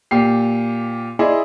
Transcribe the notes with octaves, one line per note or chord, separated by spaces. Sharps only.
A#2 G4 C7
E4 G#4 D5 D#5 C6